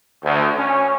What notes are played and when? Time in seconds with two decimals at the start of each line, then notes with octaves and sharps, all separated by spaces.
0.23 D2
0.56 C#4